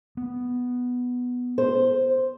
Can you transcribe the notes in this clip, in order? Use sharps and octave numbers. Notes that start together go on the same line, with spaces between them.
B3
C5